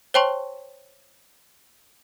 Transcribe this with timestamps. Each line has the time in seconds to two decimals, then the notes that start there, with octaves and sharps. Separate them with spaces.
0.14 C5 C#5 G5 A5 C6 C#6